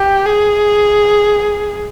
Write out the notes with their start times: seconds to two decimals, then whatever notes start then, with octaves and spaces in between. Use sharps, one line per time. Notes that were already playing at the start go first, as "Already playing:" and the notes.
Already playing: G4
0.25 G#4